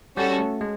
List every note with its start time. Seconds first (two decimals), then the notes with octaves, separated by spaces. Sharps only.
0.17 G3 C#4 F#4 A4
0.39 A3
0.61 G#3